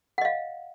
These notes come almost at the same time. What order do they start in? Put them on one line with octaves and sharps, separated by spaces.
F#5 D#5 F5